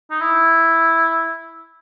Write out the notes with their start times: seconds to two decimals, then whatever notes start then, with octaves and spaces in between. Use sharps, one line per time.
0.11 D#4
0.21 E4